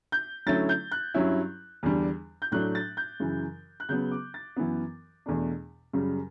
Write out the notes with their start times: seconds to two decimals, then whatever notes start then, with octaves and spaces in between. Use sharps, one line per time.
0.12 G6
0.46 D3 F#3 A3 C#4 E4 A6
0.69 G6
0.92 F#6
1.14 G2 F#3 C#4 E4
1.83 E2 D3 G3 D4
2.42 G6
2.52 A2 F#3 A3 D4 F#6
2.75 A6
2.97 G6
3.20 F#2 C#3 E3
3.80 F#6
3.89 C#3 F#3 B3 G6
4.11 D6
4.34 A6
4.56 F#2 E3 B3
5.26 E2 B2 A3 D4
5.93 F#2 C#3 G3